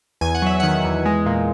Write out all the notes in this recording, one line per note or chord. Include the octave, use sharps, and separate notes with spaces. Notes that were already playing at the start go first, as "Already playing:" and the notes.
E2 G#5
F#5
F#3 E5
D#3 F#5
E2
G#3
A#2